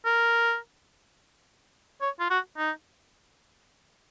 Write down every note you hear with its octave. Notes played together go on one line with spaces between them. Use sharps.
A#4
C#5
F4
F#4
D#4